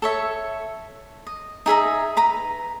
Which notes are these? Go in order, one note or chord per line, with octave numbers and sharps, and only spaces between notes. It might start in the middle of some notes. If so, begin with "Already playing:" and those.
A4 C#5 E5
D#5
D#4 G#4 E5 A#5
B4 A#5 B5